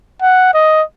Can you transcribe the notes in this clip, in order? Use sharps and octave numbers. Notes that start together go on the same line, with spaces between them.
F#5
D#5